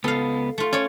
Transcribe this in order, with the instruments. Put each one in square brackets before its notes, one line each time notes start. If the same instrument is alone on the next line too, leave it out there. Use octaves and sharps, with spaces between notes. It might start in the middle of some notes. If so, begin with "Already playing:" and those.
[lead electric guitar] C#2 B3 [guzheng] A4 F5
[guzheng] A3 F4
[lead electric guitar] C#4 [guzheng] C#5 D5